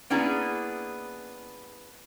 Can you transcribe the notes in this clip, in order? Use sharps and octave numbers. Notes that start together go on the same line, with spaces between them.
A#3 B3 C#4 D4 E4 G#4